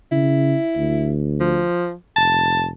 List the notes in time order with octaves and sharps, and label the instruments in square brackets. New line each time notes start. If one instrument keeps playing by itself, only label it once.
[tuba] C#3 [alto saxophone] E4
[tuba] D2
[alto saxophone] F3
[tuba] F1 [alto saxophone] A5